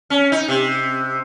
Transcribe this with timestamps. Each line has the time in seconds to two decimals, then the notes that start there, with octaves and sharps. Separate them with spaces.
0.10 C#4
0.32 D#4
0.48 C3